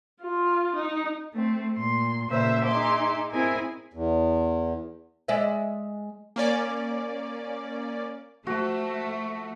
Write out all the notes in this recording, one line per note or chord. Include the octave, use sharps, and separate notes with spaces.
F4
D#4
A3 C4
A#2 C6
A#2 C#3 B4 C5 E5 E6
D#4 G#4 E5 C6 D6
C4 E4 G#4 A#4 G#5
E2
G#3 D5 E5
A#3 C#4 D5
F3 A3 F#4